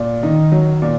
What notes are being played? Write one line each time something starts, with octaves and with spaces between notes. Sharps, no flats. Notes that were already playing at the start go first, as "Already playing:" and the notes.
Already playing: A#2
D#3 D#4
F#3
A#2